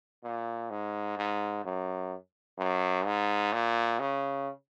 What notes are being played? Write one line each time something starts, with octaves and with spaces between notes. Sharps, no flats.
A#2
G#2
G#2
F#2
F#2
G#2
A#2
C#3